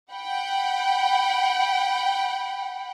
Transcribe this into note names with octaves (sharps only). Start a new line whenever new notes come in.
F#5 G5 B5